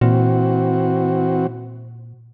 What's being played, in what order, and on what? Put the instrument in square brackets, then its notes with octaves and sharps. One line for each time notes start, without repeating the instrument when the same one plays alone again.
[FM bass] A#2 [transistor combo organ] E3 C4 F#4